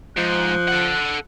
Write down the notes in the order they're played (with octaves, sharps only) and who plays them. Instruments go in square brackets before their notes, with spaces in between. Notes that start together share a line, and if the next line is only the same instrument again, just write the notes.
[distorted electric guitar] G#2 [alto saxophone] F3 [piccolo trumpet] F#6
[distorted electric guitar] A4 F#5